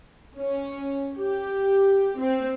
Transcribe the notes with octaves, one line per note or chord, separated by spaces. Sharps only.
C#4
G4
C4